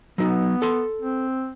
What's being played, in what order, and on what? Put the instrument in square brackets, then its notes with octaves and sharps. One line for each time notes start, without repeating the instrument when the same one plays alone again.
[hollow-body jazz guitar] F#3 D#4 [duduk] B3
[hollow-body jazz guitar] A4 C6
[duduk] C4